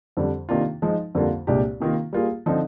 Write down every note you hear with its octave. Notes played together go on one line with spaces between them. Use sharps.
F2 D3 G3
C3 D#3 A#3 D4 F4
F3 G#3 D#4
F2 D3 G3 A#3 F4
C2 A#2 G#3 D4 G4
C3 D#3 A#3 F4
G3 A#3 F4 G#4
D3 F3 C4 D#4